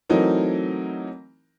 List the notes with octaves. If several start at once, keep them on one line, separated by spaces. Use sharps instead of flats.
E3 F#3 A3 C4 D#4 A#4